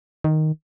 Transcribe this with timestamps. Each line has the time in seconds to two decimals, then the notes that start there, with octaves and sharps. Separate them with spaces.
0.24 D#3